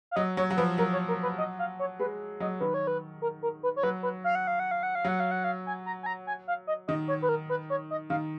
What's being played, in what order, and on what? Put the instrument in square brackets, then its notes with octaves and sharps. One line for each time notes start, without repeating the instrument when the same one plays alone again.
[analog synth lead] F5
[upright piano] F#3 [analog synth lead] D#5
[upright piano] F#3 [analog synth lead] C#5
[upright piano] F#3
[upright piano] F3 [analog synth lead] B4
[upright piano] F#3 [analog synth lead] A#4
[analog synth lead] C#5
A#4
B4
D#5
F5
C#5
[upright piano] G#3 [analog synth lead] B4
[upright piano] F#3 [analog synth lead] D#5
[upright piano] D#3 [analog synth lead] B4
[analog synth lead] C#5
B4
A#4
A#4
B4
C#5
[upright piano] F#3 [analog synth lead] B4
[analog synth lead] B4
F5
F#5
F5
F#5
F5
F#5
F5
[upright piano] F#3 [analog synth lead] F#5
[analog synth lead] F5
F#5
F5
G#5
A#5
G#5
A#5
G#5
F5
D#5
[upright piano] D#3 [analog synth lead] D#5
[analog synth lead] C#5
B4
A#4
B4
C#5
D#5
[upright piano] D#3 [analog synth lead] F5